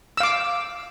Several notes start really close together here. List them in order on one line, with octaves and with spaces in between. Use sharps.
E6 F5 D6